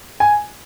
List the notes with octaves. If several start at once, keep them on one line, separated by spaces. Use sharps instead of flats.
G#5